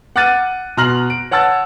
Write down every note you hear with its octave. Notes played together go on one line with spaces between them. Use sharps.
F#5 D6 F6 F#6 A6 D#7
B2 A#5 C6 F6 A#6 F#7
D7
C#5 F#5 A5 E6 A6